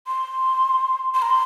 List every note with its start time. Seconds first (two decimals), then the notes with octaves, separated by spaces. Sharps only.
0.07 C6
1.14 C6
1.22 A#5
1.30 C6